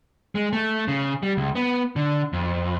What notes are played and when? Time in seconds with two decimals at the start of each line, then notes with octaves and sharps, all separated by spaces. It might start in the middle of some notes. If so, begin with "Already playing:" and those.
0.35 G#3
0.53 A3
0.88 C#3
1.23 G3
1.37 C#2
1.55 B3
1.96 D3
2.33 F2